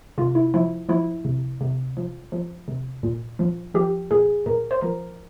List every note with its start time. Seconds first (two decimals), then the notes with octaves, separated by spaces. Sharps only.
0.18 C3 F4
0.35 E4
0.54 F3 E4
0.89 F3 E4
1.25 C3
1.61 C3
1.97 F3
2.32 F3
2.68 C3
3.03 A#2
3.39 F3
3.74 F3 G4
4.11 A#2 G#4
4.46 A#2 A#4
4.71 C5
4.81 F3 A#4